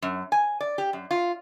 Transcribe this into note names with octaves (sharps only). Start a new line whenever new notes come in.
F#2
G#5
D5
G4
F#2
F4